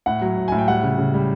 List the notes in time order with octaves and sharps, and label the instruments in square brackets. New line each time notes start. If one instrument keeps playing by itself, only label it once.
[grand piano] A2 F#5
F#3
A2
A2 G#5
G5
G3 F#5
C#3
C#3
G3